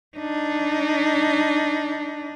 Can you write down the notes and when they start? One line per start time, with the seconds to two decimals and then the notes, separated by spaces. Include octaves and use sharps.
0.17 D4 D#4